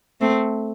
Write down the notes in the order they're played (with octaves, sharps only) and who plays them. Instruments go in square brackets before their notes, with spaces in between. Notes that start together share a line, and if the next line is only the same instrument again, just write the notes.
[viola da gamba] A3 C4